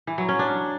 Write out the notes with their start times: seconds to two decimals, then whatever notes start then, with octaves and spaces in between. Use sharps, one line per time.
0.07 E3
0.18 F#3
0.29 C#4
0.39 D4